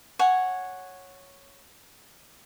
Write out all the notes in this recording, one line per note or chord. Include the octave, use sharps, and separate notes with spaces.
C#5 F#5 G#5